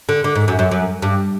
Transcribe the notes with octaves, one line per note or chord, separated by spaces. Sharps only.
D3
D3
G#2
F#2
F#2
F#2
G2